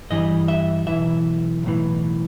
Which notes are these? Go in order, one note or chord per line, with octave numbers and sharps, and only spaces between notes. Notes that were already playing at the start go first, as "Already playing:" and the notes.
G2 E3 G3 D#5
E5
B1 A2 E3 E5
B1 A2 E3